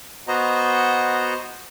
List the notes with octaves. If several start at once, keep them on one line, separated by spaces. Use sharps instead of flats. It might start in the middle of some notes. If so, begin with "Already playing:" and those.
B3 F#4 C5 D#5 A#5